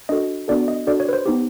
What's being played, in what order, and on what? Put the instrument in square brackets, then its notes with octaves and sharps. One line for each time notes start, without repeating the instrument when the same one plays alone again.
[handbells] D4 F#4 A4 D#5
B3 D4 F#4 A4 D5
D#5
D4 F#4 A4 D5
C#5
B4
C5
B3 D#4 G4